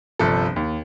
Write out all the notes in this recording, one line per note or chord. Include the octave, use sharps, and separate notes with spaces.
G1 C2 F3 A4
D#2